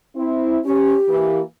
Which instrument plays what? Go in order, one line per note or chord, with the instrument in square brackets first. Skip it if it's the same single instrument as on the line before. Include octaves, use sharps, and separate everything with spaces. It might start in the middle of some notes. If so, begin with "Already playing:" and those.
[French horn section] C4 E4
[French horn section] C#4 [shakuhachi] G4
[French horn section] E3 A#3